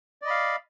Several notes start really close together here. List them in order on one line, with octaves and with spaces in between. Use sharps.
D5 D#5 B5 F5